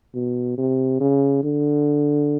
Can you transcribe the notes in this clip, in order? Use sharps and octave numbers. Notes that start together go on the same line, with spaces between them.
B2
C3
C#3
D3